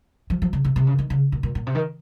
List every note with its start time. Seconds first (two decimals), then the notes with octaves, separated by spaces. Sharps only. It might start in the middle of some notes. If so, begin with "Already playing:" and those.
0.30 F3
0.42 F3
0.53 C#3
0.65 C3
0.76 C3
0.87 C#3
0.99 D#3
1.10 C#3
1.32 A#2
1.43 A#2
1.55 A#2
1.67 C3
1.75 D#3